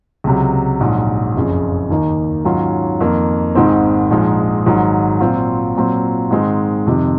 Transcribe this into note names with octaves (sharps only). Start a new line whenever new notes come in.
C#2 C3 F#3
A#1 G#2 F#3
F#1 F2 C#3
D#2 D#3 A#3 D#4
G#2 D#3 F#3 C#4 F4
F2 D#3 A#3
G#1 G#2 D#3 G#3 C4
A#1 G#2 F3 G#3 D#4
G#1 G#2 D#3 F#3
A#2 F#3 C4 F4
A#2 F#3 C4 F4
G#2 D#3 G#3 C4
F2 C3 D#3